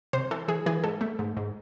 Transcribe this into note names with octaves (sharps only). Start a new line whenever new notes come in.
C3 C5
E3 A4
E3 G#4
E3 G#4
G#2 A4
A3
G#2
G#2